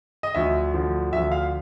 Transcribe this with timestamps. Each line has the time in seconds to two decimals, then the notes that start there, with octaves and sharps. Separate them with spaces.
0.23 D#5
0.35 D2 D3 F3 E5
0.74 D2 D3 F3
1.12 D2 D3 F3 E5
1.32 F5